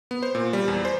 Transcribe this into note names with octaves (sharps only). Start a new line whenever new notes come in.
B3
C5
A#2
G3
E2
C5